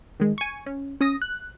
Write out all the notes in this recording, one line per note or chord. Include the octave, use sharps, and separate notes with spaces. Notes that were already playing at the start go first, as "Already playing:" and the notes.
D#3 G#3
G#5 C#6
C#4
C#4 D#6 A#6
F#6